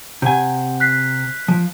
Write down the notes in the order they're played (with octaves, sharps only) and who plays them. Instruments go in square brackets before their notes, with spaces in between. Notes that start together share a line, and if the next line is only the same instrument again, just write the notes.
[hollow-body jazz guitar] C3 G#5 [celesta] F#5 G6
[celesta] F#6 B6 C7
[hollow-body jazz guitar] F3